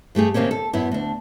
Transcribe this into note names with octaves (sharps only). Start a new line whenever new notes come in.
G2 A3 G4 G#4
C3 D#3 A#3 C4 C#4
A4
F#2 B3 E4
D2 D4